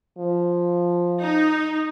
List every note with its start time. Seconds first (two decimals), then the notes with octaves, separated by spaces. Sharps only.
0.18 F3
1.21 D#4